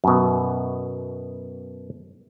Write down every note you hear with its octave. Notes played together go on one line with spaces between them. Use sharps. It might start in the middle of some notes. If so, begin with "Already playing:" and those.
F#2 B2